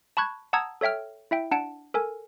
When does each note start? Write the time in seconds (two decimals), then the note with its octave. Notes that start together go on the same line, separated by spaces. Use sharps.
0.17 A5 B5 C#6 F#6 G#6
0.53 F#5 A5 A#5 D#6 E6 G#6
0.81 A4 C#5 E5 G5 F6
1.31 E4 E5 G5
1.51 D4 F#5 A5 D7
1.94 A4 A#4 G#5